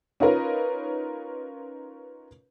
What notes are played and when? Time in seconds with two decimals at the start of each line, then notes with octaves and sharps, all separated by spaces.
0.20 C#4 D#4 F4 A#4 B4